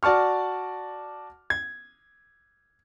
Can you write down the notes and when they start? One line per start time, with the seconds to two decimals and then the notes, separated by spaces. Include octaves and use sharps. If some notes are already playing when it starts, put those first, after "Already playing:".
0.03 F#4 D5 A5 C#6 F6
1.50 G#6